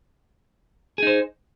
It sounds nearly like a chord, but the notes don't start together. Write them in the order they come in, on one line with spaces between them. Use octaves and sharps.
G#4 D#4 C5